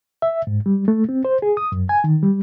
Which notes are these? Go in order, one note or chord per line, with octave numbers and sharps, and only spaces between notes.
E5
G#2
G3
A3
C4
C5
G#4
D#6
F#2
G#5
D#3
G3